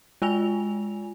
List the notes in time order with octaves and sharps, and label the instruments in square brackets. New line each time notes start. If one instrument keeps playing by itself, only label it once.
[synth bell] G#3 F4 G#5 F7